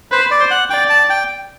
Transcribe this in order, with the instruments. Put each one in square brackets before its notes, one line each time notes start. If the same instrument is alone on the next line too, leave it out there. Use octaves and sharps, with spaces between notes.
[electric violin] B4 [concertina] C5
[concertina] D5
[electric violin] C5
[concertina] F#5
[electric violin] D5 [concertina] G5
[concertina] A5
G5